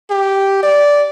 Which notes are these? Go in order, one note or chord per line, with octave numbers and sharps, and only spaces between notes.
G4
D5